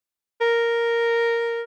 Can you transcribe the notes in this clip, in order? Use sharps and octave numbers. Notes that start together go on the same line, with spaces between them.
A#4